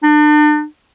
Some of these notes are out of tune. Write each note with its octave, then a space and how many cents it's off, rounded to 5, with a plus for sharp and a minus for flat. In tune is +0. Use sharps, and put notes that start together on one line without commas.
D4 +40